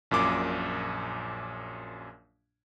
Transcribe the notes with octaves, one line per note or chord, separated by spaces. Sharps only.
A#1 F#2 A#2 D6